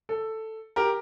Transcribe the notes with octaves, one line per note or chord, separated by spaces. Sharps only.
A4
G4 A#4